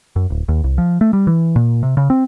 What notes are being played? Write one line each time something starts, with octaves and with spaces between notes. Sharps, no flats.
F#2
D1
D#2
C2
F3
A3
G3
E3
A#2
C3
C#3
C4